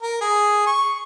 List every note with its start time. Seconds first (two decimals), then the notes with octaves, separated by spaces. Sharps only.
0.01 A#4
0.21 G#4
0.67 C#6